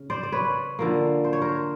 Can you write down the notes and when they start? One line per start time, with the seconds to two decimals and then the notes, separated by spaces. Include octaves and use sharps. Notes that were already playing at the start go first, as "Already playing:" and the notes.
Already playing: C#3
0.10 C5 D5
0.23 D5
0.32 B4 C#5
0.79 D3 F3 A#3
1.24 C5
1.33 C#5
1.42 A#4 C5